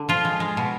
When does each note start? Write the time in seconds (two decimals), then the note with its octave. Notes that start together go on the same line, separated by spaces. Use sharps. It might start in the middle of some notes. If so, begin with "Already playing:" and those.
Already playing: D3
0.09 F3 F4
0.25 G#3
0.40 G#3
0.57 B2